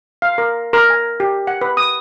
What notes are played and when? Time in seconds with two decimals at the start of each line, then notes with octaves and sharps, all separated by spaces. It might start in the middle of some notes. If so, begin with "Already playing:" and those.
0.22 F5
0.38 A#4
0.73 A#4
0.90 G#5
1.20 G4
1.47 F#5
1.61 B4
1.77 D#6